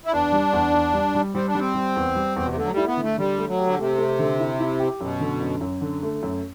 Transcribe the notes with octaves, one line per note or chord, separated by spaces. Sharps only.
E4
E2 D4
G3
E2
E2
G3
G3
G3 C4
D4
G3 C4
G3
E2
G3
E2
B2
C3
D3 A3
F#3
G3
E4
B3
D3
A3
D3 G3
A3
F#3
G4
D3
C3 A3
A3
D3
E4
E4
G4
F#2 B2
D3
F#2
F#2
D3
A3
F#2